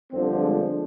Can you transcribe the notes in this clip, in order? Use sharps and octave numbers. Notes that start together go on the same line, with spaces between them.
G1 F2 D3 F3 C4
G#3